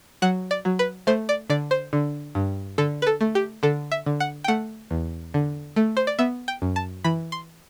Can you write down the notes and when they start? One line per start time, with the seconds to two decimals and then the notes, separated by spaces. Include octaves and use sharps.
0.22 F#3 F#5
0.51 D5
0.65 F#3
0.79 B4
1.07 A3 C5
1.29 D5
1.50 D3 D5
1.71 C5
1.93 D3
2.35 G2
2.78 D3 A4
3.02 B4
3.07 A4
3.21 A3
3.35 G4
3.63 D3 A4
3.92 E5
4.06 D3
4.20 F#5
4.44 G5
4.48 A3 F#5
4.91 E2
5.34 D3
5.76 A3
5.97 C5
6.07 D5
6.18 B3 E5
6.48 G5
6.62 F#2
6.76 A5
7.04 E3 B5
7.32 C6